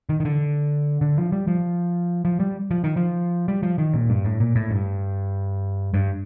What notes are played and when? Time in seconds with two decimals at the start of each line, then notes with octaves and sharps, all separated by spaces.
0.09 D#3
0.20 D#3
0.25 D3
1.01 D3
1.17 F3
1.32 G3
1.48 F3
2.25 F3
2.40 G3
2.71 F3
2.84 D#3
2.96 F3
3.48 G3
3.63 F3
3.78 D#3
3.93 A#2
4.09 G2
4.25 A2
4.40 A#2
4.55 A2
4.71 G2
5.94 G2